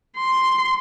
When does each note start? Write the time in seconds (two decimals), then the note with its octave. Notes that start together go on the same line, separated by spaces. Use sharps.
0.17 C6